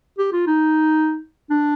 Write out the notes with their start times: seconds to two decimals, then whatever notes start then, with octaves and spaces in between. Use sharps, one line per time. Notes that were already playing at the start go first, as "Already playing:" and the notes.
0.18 G4
0.33 F4
0.47 D#4
1.50 D4